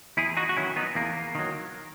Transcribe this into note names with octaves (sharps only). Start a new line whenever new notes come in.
E2 E4 G#4
D#4 F#4
F#4
D#3 F#3 C#4 E4
B3 D#4
E2 A#3
D#3 F#3